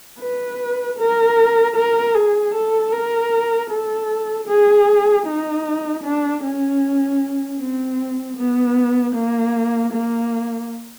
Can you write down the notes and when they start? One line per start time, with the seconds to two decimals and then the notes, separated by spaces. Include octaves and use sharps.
0.20 B4
0.99 A#4
1.76 A#4
2.15 G#4
2.54 A4
2.93 A#4
3.70 A4
4.48 G#4
5.26 D#4
6.04 D4
6.43 C#4
7.60 C4
8.37 B3
9.15 A#3
9.93 A#3